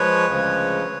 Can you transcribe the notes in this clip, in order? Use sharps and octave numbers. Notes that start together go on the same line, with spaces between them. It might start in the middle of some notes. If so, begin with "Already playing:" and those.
Already playing: F3 G#3 B4 C#5
D2 C#3 F3 G#3
G#3